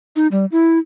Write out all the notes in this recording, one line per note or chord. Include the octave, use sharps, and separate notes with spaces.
D#4
G3
E4